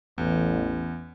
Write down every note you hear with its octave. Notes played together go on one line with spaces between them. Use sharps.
A1 E2